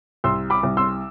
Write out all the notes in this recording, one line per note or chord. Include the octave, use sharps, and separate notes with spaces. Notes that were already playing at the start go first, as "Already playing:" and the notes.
C2 C6 E6
B5 D6
C2
C6 E6